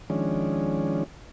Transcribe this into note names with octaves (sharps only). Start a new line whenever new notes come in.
D#3 F3 G#3 C#4 D4